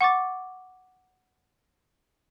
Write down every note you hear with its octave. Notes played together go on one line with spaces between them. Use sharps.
F#5 C#6 D6 A6